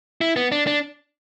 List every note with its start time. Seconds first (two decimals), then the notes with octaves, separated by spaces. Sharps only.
0.21 E4
0.36 B3
0.52 D4
0.67 D4